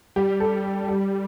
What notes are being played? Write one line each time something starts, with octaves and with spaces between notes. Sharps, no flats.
G3 G4
A4
G4